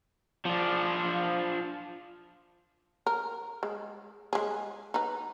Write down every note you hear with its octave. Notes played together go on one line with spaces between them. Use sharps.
F3 D4
A#4
G#3
G#3 G#4
D#4 B4